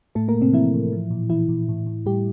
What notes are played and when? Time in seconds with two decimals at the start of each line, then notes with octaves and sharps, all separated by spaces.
0.15 A2 A3 A4
0.28 A#3 A#4
0.35 A2
0.41 C3 C4
0.53 E3 F3 E4
0.73 A2
0.92 F3
1.11 A#2
1.29 A#2 E3 E4
1.49 A#2
1.68 A2
1.86 A2
2.06 A2 G3 G4